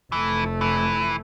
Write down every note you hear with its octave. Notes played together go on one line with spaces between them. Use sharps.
F1 E3 A3
E3